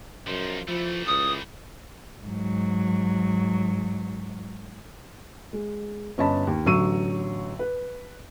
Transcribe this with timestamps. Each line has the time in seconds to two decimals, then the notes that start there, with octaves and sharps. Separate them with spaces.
0.27 F#2 F3 D#4
0.68 E3 F3 A3
1.07 C#2 D#6
2.24 G#2 F#3
5.53 G#3
6.18 G1 C#4 D#5 A5 B5
6.47 D#2
6.66 A1 D3 F#3 C#6 E6 D#7
7.59 B4